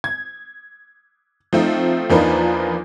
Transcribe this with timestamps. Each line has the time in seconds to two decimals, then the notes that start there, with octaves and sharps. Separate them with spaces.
0.04 G#6
1.53 F3 A3 C4 D#4
2.10 E2 F3 A#3 D4 D#4 B4